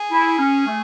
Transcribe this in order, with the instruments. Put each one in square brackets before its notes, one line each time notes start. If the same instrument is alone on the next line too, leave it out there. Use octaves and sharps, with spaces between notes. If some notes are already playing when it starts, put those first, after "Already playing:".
Already playing: [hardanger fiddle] G#4
[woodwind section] E4
C#4
A3